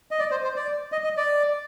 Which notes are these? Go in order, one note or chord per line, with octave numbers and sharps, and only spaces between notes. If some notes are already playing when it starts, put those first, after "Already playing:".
D#5
D5
C5
C5
D5
D#5
D#5
D5